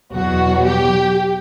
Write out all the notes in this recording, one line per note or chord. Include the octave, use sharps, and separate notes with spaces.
E2 B2 F#3 F#4
G4